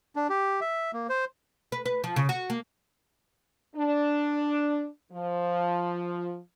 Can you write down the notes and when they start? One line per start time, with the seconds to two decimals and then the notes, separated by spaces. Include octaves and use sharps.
0.16 D4
0.29 G4
0.61 E5
0.93 A#3
1.09 C5
1.72 B4
1.86 B4
2.04 F3
2.16 C#3
2.29 F#4
2.50 A#3
3.76 D4
5.12 F3